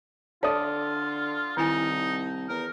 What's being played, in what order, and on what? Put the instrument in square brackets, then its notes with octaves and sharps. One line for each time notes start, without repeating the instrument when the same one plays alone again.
[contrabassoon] D3 [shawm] F4 [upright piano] A4 D5 D#6 [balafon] C#5
[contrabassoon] C2 [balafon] D#3 E4 G#5 [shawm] D#4
[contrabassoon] E2 [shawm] A#4